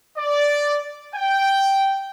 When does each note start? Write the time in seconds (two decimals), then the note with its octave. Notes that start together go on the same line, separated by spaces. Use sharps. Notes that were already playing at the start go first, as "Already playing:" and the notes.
0.17 D5
1.15 G5